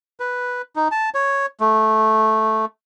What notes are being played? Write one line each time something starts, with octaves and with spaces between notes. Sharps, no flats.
B4
D#4
A5
C#5
A3